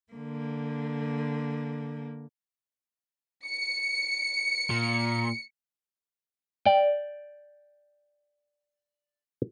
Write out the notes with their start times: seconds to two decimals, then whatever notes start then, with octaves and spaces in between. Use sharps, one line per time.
0.13 D3 A#3
3.46 C#7
4.70 A#2
6.65 D5 G5